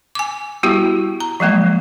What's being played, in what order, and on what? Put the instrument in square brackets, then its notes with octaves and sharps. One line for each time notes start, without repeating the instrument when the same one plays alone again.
[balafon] G#5 D6
G3 B3 E4 F#4 G4
A#5
F3 F#3 G#3 A#3